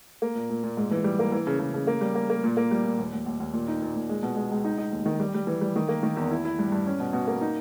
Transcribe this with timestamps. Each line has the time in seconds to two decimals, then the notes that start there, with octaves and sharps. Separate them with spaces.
0.22 A#3
0.35 A#2
0.50 A#2
0.64 A#2
0.77 G#2
0.91 E3
1.04 G3
1.19 A#3
1.32 E3
1.47 C#3
1.60 C#3
1.74 C#3
1.87 A#3
2.01 G3
2.15 A#3
2.30 A#3
2.44 A#2
2.57 A#3
2.71 G3
2.85 A#2
2.99 D#2
3.13 D#2
3.26 D#2
3.40 D#2
3.53 A#2
3.68 D#4
3.82 A#2
3.96 A#2
4.09 G#3
4.23 B2
4.36 G#3
4.51 C#2
4.65 D#4
4.78 D#4
4.92 D#2
5.06 D#3
5.20 G3
5.34 G3
5.47 E3
5.61 G3
5.76 D#3
5.89 A#3
6.03 D#3
6.16 E2
6.31 E4
6.45 E4
6.59 G2
6.72 G2
6.86 C#4
7.00 B2
7.13 B2
7.27 A#3
7.41 D#4